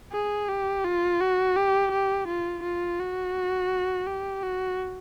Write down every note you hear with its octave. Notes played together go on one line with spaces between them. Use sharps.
G#4
G4
F4
F#4
G4
G4
F4
F4
F#4
G4
F#4